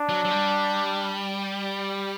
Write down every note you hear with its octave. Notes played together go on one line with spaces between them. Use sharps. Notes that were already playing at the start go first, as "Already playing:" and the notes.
Already playing: D4
F#3
F#3
G3